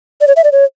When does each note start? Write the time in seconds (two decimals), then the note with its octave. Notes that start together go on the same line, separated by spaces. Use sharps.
0.21 D5
0.27 C#5
0.36 E5
0.44 D5
0.52 C#5